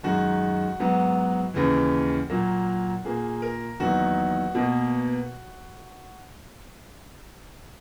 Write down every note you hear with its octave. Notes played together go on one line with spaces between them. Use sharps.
F#2 D#3 G#3 F#4
G#2 F#3 B3
D#2 C#3 E3
A#2 F#3 A#3
A#2 A#3 G#4
A#4
E2 D#3 F#3 A#3 F#4
B2 A#3